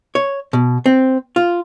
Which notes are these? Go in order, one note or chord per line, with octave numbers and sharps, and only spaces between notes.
C#5
B2
C4
F4